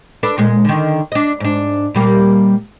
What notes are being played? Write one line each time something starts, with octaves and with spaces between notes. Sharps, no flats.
D4 A4 B4
A#2 G#3
D3 D#3
D4 D#5
G#2 D4
A#2 G3 A#3